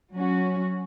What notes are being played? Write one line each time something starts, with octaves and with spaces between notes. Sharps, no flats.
F#3 C#4 F#4